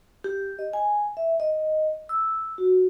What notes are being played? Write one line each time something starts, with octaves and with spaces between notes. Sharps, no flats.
G4
D#5
G#5
E5
D#5
E6
F#4